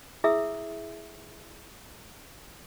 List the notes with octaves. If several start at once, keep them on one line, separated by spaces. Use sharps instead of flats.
E4 G#4 E5 D#6 E6